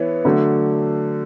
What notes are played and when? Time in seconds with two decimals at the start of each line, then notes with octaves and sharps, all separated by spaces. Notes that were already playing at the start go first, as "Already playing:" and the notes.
Already playing: E3 B3 E4 C#5
0.25 D3 F#3 A3